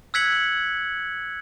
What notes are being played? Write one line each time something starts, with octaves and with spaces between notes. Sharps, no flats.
E6 F#6 G#6 B6 C#7 F#7